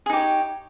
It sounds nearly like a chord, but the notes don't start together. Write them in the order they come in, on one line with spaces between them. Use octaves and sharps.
G#4 D#4 G4 C#5